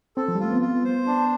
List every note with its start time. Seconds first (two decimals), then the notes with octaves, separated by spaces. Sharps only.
0.17 C4 A4
0.28 F3
0.35 G3
0.40 A3 F4
0.51 B3
0.62 F4
0.84 C5
1.07 D4